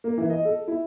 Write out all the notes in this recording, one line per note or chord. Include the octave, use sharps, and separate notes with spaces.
A#3
E3
D#5
A4
E4